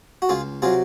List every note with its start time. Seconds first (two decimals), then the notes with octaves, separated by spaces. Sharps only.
0.22 F#4
0.29 C#2 F4 G#4
0.62 C3 F#3 F4 G#4